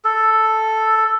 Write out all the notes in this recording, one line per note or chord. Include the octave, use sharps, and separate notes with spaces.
A4